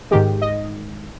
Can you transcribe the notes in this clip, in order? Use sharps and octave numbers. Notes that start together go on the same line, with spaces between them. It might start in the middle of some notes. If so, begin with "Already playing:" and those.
G#2 D#3 G#3 G4
D#5